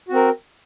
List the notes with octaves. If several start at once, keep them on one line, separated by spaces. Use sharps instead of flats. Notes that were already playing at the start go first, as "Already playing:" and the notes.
C4 F#4 A#4